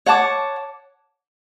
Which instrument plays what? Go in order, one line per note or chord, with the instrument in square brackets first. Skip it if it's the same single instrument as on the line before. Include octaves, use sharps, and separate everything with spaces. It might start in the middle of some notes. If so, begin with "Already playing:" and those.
[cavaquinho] C#5 F#5 A5 D6